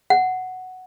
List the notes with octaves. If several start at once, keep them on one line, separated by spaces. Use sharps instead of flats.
F#5